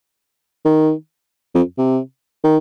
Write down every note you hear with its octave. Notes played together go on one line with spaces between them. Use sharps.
D#3
F2
C3
D#3